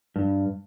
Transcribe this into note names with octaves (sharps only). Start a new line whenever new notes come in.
G2